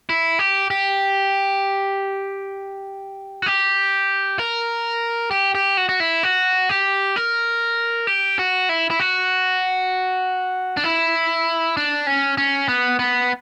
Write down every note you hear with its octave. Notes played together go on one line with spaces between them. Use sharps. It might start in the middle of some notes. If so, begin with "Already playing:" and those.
E4
G4
G4
F#4
G4
A#4
G4
G4
F#4
F#4
E4
F#4
G4
A#4
G4
F#4
E4
E4
F#4
D4
E4
D4
C#4
C#4
B3
B3